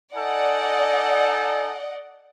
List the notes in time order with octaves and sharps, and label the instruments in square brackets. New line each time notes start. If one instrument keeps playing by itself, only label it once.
[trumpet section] D#4 A4 G#5 [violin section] D5 D#5 F#5